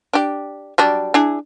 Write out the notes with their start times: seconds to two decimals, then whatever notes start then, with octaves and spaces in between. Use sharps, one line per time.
0.13 D4 G4
0.78 F#3 G3 D4
1.14 D4 E4 G#4